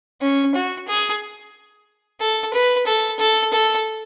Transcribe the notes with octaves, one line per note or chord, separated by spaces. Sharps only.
C#4
F#4
G#4
A4
B4
A4
A4
A4